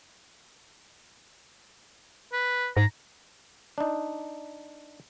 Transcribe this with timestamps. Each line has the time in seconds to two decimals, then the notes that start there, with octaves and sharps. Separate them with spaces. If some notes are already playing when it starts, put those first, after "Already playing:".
2.33 B4
2.77 G#2 A#5
3.78 D4 D#4